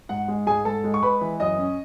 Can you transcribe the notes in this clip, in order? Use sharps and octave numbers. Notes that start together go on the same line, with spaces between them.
G#2 F#5
G#3
G#2 G#4 G#5
G#2 A4 A5
G#3
C#6
G#3 B4 B5
E3
F#2 D#5 D#6
C#4